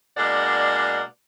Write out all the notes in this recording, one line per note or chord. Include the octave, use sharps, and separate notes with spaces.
B2 G#3 A#3 D4 D5 F#5